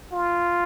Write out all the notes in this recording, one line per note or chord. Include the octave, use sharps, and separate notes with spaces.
F4